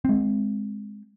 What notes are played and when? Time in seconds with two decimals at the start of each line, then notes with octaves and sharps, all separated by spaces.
0.05 G#3 C4